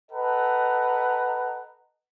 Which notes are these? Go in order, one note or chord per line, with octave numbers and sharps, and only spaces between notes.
A4 B4 D#5 F#5 A#5